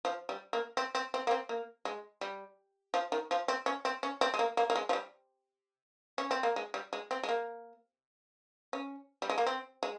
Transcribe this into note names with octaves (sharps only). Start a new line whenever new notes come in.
F3
G3
A#3
C4
C4
C4
A#3
C4
A#3
G#3
G3
F3
D#3
F3
C4
C#4
C4
C#4
C4
G#3
A#3
A#3
A#3
G#3
F3
G3
C#4
C4
A#3
G#3
G3
G#3
C4
G#3
A#3
C#4
G3
G#3
A#3
C4
G#3